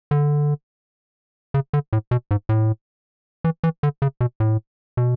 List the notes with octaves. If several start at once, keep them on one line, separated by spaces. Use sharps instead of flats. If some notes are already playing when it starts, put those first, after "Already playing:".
D3
C#3
D3
A2
B2
G#2
A2
E3
E3
D3
C#3
B2
A2
B2